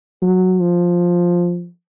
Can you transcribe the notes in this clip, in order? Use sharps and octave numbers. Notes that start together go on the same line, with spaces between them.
F#3
F3